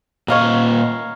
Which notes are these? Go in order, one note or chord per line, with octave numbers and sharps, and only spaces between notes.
A#2 C#5 D#5 F5 A#5